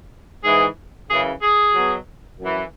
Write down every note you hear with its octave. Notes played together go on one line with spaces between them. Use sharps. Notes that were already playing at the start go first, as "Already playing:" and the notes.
G#2 E3 G#4
F#2 C#3 E3 G#4
G#4
B2 F#3
F#2 E3